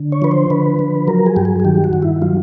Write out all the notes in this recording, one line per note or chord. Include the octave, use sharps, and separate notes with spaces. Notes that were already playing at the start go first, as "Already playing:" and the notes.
Already playing: D3
C#5
F3 B4
C5
D3 B4
F3
F#3 A#4
G#4
G2 G4
G#4
G#4
D#3 G4
F#4
G2
E4
F#3 F4